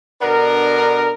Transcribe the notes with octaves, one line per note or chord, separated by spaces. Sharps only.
B2 D3 B3 D4 A#4